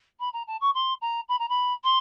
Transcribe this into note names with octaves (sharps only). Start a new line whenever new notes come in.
B5
A#5
A5
C#6
C6
A#5
B5
A#5
B5
C6